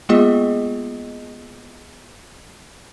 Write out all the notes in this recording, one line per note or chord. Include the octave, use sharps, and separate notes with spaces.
G#3 A#3 B3 F4 G#4 D#5